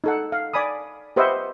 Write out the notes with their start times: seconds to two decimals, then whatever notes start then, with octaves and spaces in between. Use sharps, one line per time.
0.04 D#4 A4 F#5
0.32 F5
0.54 D5 G#5 B5 D#6
1.16 G4 B4 C5 D#5 E5 F#5